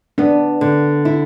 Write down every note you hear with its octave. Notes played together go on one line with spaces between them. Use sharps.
B3 D4
D3
E4